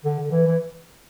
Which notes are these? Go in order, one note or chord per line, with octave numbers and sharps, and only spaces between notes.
D3
D3
E3
E3